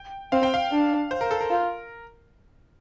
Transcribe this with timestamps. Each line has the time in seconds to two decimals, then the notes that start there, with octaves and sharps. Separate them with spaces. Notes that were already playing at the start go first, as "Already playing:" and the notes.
Already playing: G5
0.32 C4 F5
0.43 G5
0.54 F5
0.71 D4
1.11 C5
1.21 A#4
1.31 A4
1.41 A#4
1.50 F4